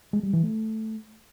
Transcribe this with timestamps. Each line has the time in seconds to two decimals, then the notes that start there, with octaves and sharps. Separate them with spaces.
0.13 G#3
0.23 G3
0.33 E3
0.43 A3